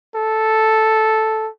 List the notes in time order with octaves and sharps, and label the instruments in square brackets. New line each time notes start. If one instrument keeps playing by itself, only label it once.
[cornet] A4